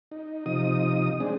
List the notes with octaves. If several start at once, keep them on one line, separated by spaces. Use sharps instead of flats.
D#4
C3 F3 D#4 D#6
G#3 C4 D4